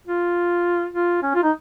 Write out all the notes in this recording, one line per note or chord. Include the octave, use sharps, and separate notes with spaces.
F4
F4
C#4
F4
D#4